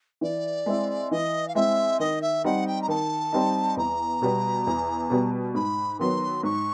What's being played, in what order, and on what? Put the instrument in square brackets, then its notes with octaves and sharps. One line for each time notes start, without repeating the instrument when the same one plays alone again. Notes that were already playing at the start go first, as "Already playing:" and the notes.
[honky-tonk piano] E3 [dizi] D5
[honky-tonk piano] G#3 C4 E4
[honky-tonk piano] E3 [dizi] D#5
[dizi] F5
[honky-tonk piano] G#3 C4 E4 [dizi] E5
[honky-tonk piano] D#3 [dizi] D#5
[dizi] E5
[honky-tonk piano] G3 C4 D#4 [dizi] F#5
[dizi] G5
A#5
[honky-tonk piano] D#3 [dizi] A5
[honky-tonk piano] G3 C4 D#4
[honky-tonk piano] E2 [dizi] A#5
[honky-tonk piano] B2 G3 B3
E2
B2 G3 B3
[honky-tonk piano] G#2 [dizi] B5
[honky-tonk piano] D#3 F#3 B3 [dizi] C6
[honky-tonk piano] G#2 [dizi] C#6